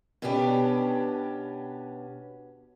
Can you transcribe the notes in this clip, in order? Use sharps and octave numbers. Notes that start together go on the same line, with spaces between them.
B2 B3 C#4 D4 G4